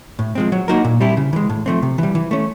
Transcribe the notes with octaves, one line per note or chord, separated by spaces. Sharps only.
A2
F3 G#3 C4
F#3
A#3 D#4 F#4 A#4
A#2
G3 C4 E4 G4
C#3
E3 G#3
A2
F3 A3 C4
C3
E3 G3
E3
A3 C#4